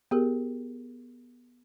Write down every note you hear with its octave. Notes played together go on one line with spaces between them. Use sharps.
B3 G4 G#4 A#4